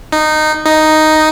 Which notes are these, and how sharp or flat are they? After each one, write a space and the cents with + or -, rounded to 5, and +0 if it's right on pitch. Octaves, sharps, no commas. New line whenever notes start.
D#4 -15
D#4 +0